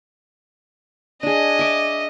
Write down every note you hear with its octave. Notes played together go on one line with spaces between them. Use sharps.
D4 G#4 D#5
E5 D6